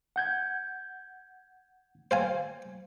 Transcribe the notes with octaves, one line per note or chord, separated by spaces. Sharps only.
F#5 G6 G#6
C5 F5 G#5